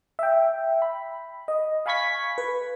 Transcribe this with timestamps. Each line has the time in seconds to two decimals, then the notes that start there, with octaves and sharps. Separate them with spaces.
0.19 E5 G5
0.82 B5
1.48 D#5
1.86 F5 G#5 B5 C#6 G#6 B6
2.38 B4